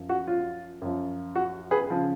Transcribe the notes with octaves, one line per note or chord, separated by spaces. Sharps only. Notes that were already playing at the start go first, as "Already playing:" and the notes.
Already playing: F#2 F3
F#4
F4
F#2 F3
F#4
G#4 B4
C#3 F3